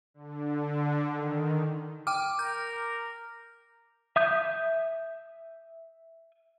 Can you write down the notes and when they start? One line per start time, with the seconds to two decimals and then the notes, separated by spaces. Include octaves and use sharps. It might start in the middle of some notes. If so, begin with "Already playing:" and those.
0.14 D3
1.12 D#3
2.07 G5 D6 F6
2.39 A#4 G6
4.16 E5 D#6 G6